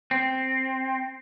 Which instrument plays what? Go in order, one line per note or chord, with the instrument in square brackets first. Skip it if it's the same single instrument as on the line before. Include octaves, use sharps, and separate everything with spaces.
[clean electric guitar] C4